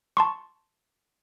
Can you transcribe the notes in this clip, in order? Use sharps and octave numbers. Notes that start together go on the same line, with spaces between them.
A5 C6 C#6